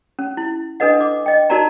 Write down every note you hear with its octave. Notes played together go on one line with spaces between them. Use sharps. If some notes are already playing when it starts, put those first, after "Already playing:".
C#4
E4
D4 A4 B4 D#5 F#5
D6
D#5 G5
D#4 F#4 A#4 D5 A5 A#5